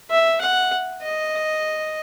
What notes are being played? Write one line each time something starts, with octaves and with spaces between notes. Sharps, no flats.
E5
F#5
D#5